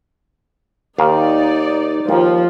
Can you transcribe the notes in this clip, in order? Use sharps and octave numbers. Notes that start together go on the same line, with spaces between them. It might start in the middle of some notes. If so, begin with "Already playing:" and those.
D#2 D#4 D5 F5
D#2 F3